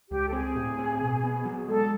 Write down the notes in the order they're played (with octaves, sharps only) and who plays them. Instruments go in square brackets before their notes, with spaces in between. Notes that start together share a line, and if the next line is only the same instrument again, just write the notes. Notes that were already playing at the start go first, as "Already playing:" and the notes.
[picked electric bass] C#2 [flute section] G4
[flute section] A4
[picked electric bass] C4 [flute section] G#4
[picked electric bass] A2
C4
B2
B3
F#3
[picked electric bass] G#3 [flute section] A4